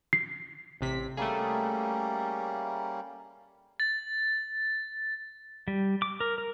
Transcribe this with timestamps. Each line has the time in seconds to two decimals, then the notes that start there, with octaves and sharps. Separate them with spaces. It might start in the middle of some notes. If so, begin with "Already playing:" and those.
0.13 C7
0.81 A1 C3 B6
1.17 G3 A3 A#3 C#4 G#4
3.80 A6
5.68 G3
6.02 D6
6.20 A#4
6.38 A#4